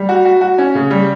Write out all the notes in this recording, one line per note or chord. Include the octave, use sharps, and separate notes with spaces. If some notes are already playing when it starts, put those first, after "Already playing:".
Already playing: G3
F#4
F#4
F#4
C#4
C#3
G3